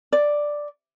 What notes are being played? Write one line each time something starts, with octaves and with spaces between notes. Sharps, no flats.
D5